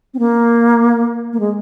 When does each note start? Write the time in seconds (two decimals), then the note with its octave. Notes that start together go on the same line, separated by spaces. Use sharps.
0.14 C4
0.19 A#3
1.33 A#3
1.40 G#3